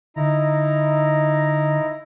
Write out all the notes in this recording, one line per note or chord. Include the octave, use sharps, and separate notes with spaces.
D3 D#4 E4 A#5